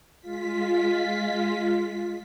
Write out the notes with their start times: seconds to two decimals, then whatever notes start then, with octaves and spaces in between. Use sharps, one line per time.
0.20 G#3 F4 B6